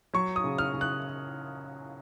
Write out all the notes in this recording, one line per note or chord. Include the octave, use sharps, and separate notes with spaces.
F#3 C#6
D#6
C#3
F6
C#3
F#6